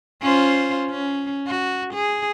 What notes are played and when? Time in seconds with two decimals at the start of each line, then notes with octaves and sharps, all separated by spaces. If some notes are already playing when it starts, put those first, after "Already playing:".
0.22 C#4 F4 C5
0.90 C#4
1.47 F#4
1.94 G#4